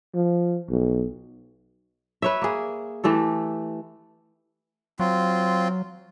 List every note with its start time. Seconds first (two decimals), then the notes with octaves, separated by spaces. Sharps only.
0.14 F3
0.70 B1
2.22 B4 C#5 E5
2.42 A#3 G#4
3.04 E3 A3 G4 A4
5.00 F#3 C4 F4